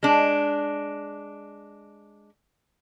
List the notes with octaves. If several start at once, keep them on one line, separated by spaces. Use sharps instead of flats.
G#3 D4